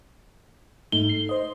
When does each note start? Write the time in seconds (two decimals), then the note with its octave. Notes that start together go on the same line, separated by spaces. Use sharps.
0.92 G#2 A3 D#4 G7
1.09 C7
1.29 C5 D#5